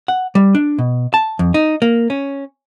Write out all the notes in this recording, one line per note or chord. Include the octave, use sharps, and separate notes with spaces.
F#5
G3
D4
B2
A5
F2
D#4
A#3
C#4